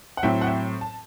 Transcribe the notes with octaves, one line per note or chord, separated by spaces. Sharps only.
F#5
A2 F#3 C4 E5 G5
F#5
E5 G5
A5